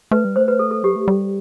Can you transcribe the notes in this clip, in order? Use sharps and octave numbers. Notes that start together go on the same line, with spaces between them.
A3 B4
G3
A3 C5
B4
A4
A4
F#3 G4
A3
G3